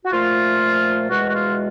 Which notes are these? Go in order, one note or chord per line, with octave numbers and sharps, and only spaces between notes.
F#4
A#2 F3 A3 F4
E2 B2 G#3 F#4
F#4
F4